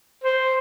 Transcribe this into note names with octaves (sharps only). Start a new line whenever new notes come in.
C5